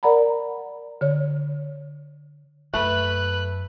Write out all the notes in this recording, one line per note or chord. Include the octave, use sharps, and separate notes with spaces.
A#4 D5 F#5 A#5 B5
D3 C#5
F#2 A3 B4 F#6